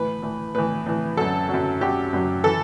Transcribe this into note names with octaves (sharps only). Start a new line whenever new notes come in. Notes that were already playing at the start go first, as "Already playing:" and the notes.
Already playing: A2 E3 B4
A2 E3
A2 E3 B4
A2 E3
F#2 F#3 A4
F#2 F#3
F#2 F#3 G4
F#2 F#3
E3 A4